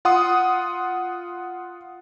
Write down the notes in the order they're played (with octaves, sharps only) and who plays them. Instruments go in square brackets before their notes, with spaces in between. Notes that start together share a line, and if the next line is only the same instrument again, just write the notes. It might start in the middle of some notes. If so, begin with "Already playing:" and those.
[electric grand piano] F4 F#5 C6 D#6